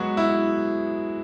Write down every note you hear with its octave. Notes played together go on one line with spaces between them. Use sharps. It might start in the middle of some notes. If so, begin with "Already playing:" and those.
Already playing: F#3 G#3 B3 F#4 G#4 B4
E4